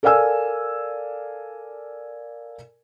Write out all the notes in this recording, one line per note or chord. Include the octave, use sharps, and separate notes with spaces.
A4 A#4 D5 F5 G#5 E6